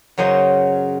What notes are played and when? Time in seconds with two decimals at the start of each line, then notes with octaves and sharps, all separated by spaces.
0.18 F#2 C#3 F#3 C5 D#5